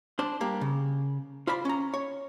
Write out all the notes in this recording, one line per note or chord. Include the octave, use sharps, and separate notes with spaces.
D4 C5
G3 A#3 G4
C#3
F4 C5 D5 B5
C#4 A#5
C#5